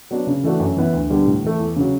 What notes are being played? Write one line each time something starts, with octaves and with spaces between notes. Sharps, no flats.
F#3 B3 D4
C#3
E3 A3 D4 F#4
F#2
E3 B3 E4
D2
D3 G3 B3
A2
E3 A3
E2
C#3 F#3